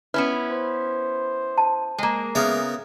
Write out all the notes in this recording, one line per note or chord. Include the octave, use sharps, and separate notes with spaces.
B3 C#4 E4 B4
C5
A5
G#3 A#3
C#3 B3 A#4 E5